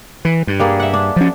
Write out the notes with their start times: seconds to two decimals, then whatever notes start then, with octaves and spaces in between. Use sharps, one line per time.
0.25 E3
0.47 G2
0.60 G3 A#3 G#4
0.80 E5 F#5
0.93 D4
1.16 F3 C#4